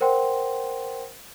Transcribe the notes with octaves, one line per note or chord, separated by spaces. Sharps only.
A#4 C5 F#5 G5 C6